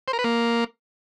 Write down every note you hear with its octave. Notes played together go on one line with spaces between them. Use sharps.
C5
A#4
B4
A#3